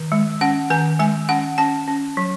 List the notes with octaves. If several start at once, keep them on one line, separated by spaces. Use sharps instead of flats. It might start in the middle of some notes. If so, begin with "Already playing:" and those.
Already playing: D#3
G#3
C#4 F#5
D#3 G#5
G#3 G#5
C#4 F#5
C#4 A5
C#4
F#3